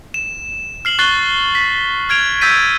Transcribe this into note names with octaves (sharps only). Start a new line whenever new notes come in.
E7
F6 C7 F#7
C#6 F#6 A6 C7 G7
B6
F6 G#6 D7 F7
E6 G6 A6 B6 D#7